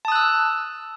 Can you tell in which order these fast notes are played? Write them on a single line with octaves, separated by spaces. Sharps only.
A5 D#6 F#6 E6